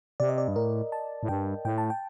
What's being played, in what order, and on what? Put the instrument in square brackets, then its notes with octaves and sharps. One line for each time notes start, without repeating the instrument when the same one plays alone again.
[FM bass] C3 [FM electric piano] D5
[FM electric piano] D#5
D5
[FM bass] G2
[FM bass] A2 [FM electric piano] A#4
[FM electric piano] A5
[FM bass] A2
[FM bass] G2 [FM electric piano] G5
[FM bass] A2 [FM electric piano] G5
[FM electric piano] A5
G5